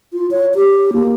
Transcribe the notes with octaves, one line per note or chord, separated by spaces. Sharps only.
F4
C#5
G4
A#3